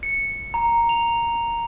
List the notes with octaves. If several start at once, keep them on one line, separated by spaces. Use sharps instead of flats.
C#7
A#5
F7